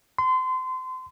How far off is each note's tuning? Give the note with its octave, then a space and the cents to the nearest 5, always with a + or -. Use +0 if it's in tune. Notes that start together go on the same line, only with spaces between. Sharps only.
C6 -30